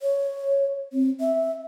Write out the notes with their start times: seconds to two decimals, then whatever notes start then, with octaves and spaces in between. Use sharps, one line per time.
0.01 C#5
0.93 C4
1.20 E5